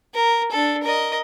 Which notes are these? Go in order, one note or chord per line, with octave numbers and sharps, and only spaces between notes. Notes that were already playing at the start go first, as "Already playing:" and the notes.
A#4
D4 A4
A#4 D#5